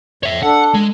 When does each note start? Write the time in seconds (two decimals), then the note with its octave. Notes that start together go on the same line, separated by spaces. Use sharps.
0.23 F2 C#5 E5
0.43 D4 A4 F#5
0.74 G#3